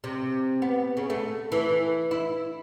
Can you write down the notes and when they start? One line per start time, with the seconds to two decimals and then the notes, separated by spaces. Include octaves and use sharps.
0.04 C3
0.62 B3
0.97 C#3
1.10 A3
1.52 E3
2.11 E4